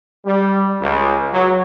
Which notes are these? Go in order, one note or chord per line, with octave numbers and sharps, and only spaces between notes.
G3
C#2
F#3